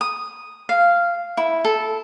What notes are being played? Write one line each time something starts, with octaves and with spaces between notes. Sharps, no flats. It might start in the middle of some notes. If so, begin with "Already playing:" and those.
D#6
F5
E4
A4